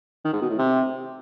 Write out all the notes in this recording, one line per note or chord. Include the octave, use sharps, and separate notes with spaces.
D#3
G#2
B2
A2
C3